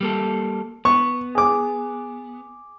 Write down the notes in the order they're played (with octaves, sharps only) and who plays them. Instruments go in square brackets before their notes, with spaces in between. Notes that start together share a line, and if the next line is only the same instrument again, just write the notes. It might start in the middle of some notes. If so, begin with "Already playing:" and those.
[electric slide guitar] G3 A#3 A4
[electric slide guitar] B3 [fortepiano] C#6
[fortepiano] G#4 D6